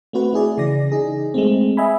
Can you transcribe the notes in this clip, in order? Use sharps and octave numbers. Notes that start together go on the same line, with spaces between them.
A3 C4 F#4 B4 F#5
A3 E4 G#4 D5
C#3 E3 D5 A#6
D#4 G#4
G#3 A3 C4
D#5 E5 G#5 B5